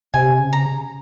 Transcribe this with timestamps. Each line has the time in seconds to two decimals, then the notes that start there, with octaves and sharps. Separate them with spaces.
0.14 C3 G#5
0.39 C#3
0.53 A#5